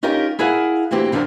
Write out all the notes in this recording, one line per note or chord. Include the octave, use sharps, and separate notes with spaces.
C#4 D#4 F4 G4 A#4
E4 G#4 A#4 F5 F#5
D2 E3 A#3 C4 G4
F2 D3 F3 F#3 G4 A#4